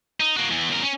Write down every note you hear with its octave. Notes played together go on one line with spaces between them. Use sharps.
D#4
A#3 F#4
E2 E3
E2 A#4
C#4